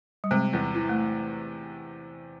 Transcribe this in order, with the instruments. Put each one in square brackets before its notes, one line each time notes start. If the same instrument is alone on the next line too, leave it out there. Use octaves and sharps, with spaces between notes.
[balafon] G3
[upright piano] C3 [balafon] G#3
[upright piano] E2
E3
[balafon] A3